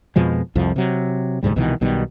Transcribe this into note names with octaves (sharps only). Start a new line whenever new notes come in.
F2 B2 F3 G#3
C2 F2 F3
C3 F#3
E1 D2 G#2 G3
C2 B2 D#3 E3
B1 B2 D#3 G3